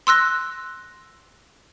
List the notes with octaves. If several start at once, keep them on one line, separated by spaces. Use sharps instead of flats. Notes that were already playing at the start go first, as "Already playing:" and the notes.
C6 E6 F#6 A#6